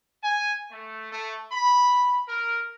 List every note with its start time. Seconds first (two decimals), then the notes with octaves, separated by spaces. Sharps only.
0.24 G#5
0.70 A3
1.12 A3
1.52 B5
2.28 A#4